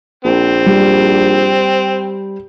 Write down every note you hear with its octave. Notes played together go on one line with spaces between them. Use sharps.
A#1 C4
G3